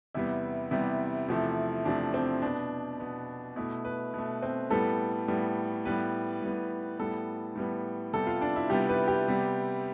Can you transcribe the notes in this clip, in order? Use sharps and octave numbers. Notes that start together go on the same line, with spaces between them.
E2 C3 G3 B3 E4
E2 C3 G3 B3
E2 C3 F3 A3
E2 C3 F3 A3 D4
C4
B2 B3 D4
B2 B3
B2 A3 E4
B4
B2 A3
C4
A2 G3 B3 A4
A2 G3 B3
A2 G3 B3 B4
A2 G3 B3
A2 G3 B3 A4
A2 G3 B3
C3 G3 B3 A4
F4
D4
E4
C3 G3 B3 G4
B4
G4
C3 G3 B3